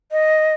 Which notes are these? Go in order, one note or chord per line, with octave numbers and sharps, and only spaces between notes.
D#5